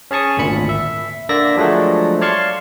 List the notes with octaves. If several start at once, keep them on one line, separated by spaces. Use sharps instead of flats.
C#4 G#4 A5 C#6 D#6
G#1 D2 A#2 B5 C#7
E5
D3 A#3 D5 E5 A#6
F3 F#3 G#3 A3 D4
C#5 D5 F5 A5 C6 C#6